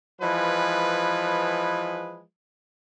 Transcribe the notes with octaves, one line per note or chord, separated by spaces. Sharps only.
E3 F3 G#3 B4